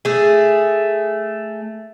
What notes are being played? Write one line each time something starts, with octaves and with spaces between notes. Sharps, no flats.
A3 G#4